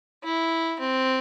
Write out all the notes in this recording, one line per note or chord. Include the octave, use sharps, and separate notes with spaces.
E4
C4